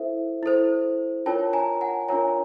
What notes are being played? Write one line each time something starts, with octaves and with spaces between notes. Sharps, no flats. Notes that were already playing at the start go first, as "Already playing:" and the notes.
Already playing: E4 A4 C5 E5
E4 A4 C5
D4 F4 A#4 C#5 G5 A5
G#5 A#5
F#5 G#5
D4 F4 A#4 C#5 G#5 A#5